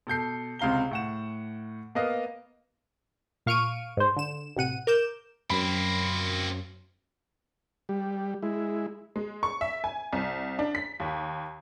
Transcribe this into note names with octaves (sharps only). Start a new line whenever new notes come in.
B2 A4 G6 C7
C#2 C3 F5 A#5 G7
A2 F#5 E7
A#3 B3 D#5 F5
A#2 F5 C#6 F6 D7 D#7
G#2 C5
D3 E7
A1 C3 F#5 D#7
A#4 D6 G6 E7
F#2 A#3 C4 B5
G3
G#3 E4
G#3
C#6
E5
G#5
C2
D4
B6
D#2